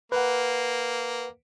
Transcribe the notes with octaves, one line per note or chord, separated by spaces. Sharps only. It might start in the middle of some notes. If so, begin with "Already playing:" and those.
A#3 B4 F#5